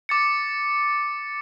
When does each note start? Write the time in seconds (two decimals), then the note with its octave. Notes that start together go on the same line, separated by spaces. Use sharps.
0.09 D6 A6 C#7